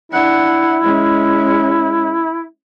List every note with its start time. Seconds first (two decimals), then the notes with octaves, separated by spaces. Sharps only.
0.12 D4 E4 F#5
0.82 G#3 C#4